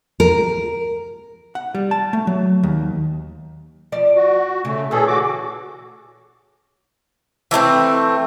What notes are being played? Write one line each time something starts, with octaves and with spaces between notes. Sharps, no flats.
A#4
F#5
G3
A5
A3
F#3
D#2
F3 D5
F#4
C#3 A3
A#2 E3 C#4 G#4 A4
F#4 D6
E3 G#3 A3 C4